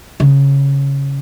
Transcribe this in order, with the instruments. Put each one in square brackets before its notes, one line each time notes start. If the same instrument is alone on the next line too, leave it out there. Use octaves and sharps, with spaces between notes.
[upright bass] C#3